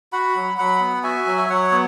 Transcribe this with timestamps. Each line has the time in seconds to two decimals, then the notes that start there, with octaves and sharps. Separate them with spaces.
0.13 F#4 F#5 B5
0.36 F#3
0.58 F#3 F#5 B5
0.80 B3
1.03 F#4 E5 G#5
1.27 F#3
1.38 E5
1.49 F#3 C#5 F#5
1.72 B3